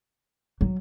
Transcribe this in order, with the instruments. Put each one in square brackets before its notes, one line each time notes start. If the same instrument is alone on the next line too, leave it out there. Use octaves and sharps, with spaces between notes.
[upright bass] F#3